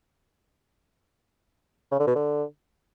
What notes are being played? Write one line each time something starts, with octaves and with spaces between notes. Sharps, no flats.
C#3
D3
B2
D3